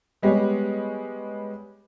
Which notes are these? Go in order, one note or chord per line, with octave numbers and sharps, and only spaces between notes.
G3 G#3 B3 G4 C#5